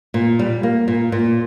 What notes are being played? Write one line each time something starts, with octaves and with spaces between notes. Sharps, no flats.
A#2
G3
A#3
A#2
A#2